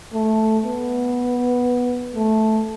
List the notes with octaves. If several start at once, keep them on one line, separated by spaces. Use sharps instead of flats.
A3
B3
A3